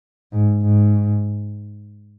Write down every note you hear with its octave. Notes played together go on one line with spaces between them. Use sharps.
G#2
G#2